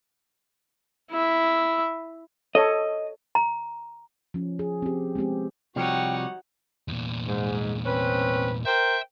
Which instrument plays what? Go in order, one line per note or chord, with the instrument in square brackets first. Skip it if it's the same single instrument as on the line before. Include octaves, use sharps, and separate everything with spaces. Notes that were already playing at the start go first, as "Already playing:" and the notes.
[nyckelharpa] E4 E5
[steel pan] A4 C#5 [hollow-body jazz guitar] D#5
[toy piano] A#5
[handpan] F3 C#4
G#4
C4 G4
G#3 B3 C4 G4
[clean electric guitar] C3 F3 G3 [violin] D#4 C#5 [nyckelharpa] F#4 F#5 [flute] G5
[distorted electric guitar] E2 A#2
[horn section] G#2
C4 C#4 B4
[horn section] A#4 C5 G5 [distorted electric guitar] E5